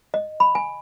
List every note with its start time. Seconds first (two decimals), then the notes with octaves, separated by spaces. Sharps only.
0.14 D#5
0.40 B5
0.55 G#5